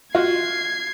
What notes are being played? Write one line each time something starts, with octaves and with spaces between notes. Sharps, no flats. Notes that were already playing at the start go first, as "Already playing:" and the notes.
F4 F#4 G#6 C7